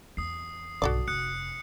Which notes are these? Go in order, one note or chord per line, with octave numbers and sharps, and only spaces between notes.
E2 D#6 C7
B1 G2 F#4 A4 D5
F1 D#6 F#6 C#7